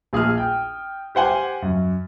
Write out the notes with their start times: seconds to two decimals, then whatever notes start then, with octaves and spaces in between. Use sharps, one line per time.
0.13 A#1 G#4 D#6 F6
0.38 G5
1.15 G4 C5 F#5 G#5
1.62 F#2